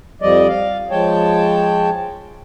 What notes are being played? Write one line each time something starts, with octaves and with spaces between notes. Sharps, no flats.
F2 F3 G3 D5 D#5
F5
F3 G#3 C#5 G5 A5